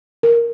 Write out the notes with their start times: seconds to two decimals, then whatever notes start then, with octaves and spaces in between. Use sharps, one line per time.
0.23 A#4